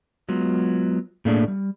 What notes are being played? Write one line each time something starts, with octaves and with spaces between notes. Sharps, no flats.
F#3 G#3 B3 F4
A2 A3 A#3 D4 G#4
G3